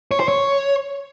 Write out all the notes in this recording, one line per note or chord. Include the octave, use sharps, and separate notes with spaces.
C#5
C5
C#5